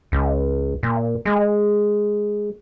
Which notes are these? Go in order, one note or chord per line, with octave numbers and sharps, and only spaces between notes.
C#2
A#2
G#3